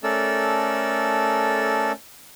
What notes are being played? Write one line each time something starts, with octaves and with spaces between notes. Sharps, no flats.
A3 C#4 A4 A#4 D5 E6